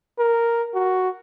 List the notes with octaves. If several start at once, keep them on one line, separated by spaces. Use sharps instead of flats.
A#4
F#4